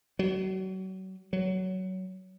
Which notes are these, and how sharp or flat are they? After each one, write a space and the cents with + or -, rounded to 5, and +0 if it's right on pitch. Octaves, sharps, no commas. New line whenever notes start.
F#3 +30
F#3 +15